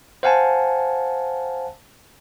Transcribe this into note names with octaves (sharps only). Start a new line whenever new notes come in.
C5 F5 F#5 G#5 A5